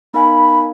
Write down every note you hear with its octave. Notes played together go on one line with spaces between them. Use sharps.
B3 D#4 A#4 F5 G#5 B5